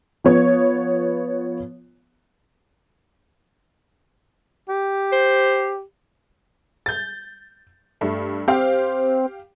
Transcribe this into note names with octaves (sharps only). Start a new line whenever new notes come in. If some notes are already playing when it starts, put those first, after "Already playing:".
F3 B3 C#5
G4
C5
G6 A6
G2 A3
C4 G4 F5